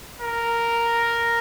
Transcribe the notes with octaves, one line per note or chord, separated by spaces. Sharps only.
A#4